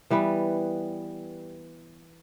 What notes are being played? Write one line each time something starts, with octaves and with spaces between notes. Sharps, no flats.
E3 G3 B3